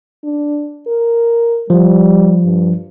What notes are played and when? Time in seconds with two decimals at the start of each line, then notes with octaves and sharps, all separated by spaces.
0.23 D4
0.88 A#4
1.70 F3 G3
2.45 G2